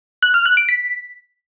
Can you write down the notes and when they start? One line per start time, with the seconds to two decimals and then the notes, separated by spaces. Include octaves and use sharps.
0.23 F#6
0.34 F6
0.46 F#6
0.57 D7
0.69 B6